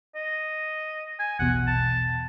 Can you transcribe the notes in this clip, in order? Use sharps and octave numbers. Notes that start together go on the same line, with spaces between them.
D#5
G#5
A#1 E2 B2 F#5
A5